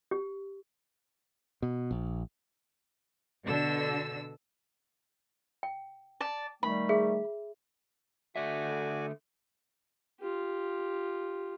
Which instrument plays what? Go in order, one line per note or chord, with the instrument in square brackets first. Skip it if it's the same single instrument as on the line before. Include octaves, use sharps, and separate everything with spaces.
[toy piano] G4
[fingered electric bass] B2
A#1
[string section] B2 D3 E6
[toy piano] G5
[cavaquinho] D5 A5
[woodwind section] D#3 G3 A3 [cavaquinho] B5
[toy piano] G#4 [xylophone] E5
[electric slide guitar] D3 A3 E5 [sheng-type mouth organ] F#4 D5 G#5
[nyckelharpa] F4 G4